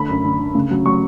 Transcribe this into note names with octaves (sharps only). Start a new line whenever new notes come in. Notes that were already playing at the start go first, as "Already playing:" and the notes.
Already playing: D3 A3 B5
F#2
D3
D3
C#3
F#3
F#3 C#6